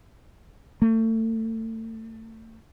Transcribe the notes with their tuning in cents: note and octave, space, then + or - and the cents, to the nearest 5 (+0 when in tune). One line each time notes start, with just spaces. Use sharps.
A3 +30